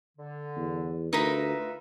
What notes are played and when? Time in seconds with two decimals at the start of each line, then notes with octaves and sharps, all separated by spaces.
0.17 D3
0.57 E2
1.13 D2 D#4 F4 A#4 B4 E5 B5